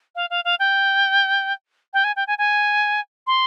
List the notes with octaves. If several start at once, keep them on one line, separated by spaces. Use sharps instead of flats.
F5
F5
F5
G5
G5
G#5
G5
G#5
G#5
C6